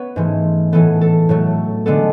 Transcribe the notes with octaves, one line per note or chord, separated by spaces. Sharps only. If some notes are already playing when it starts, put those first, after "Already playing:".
Already playing: B3 B4 C#5
G#2 E3 A3
A2 E3 B3 A4
A4
A2 F#3 A3
D3 G#3 B3 A4